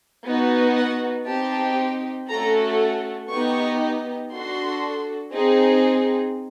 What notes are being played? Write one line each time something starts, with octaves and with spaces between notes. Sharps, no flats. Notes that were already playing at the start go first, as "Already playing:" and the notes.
B3 D#4 F#4
F#5
C4 D#4 G4 A5
A3 C#4 F#4 A4 A#5
B3 D#4 G4 C#6
D4 F#4 A4 C6
C4 D#4 G#4